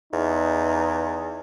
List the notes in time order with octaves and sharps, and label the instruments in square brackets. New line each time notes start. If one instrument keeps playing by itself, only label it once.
[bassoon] E2 [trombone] D#4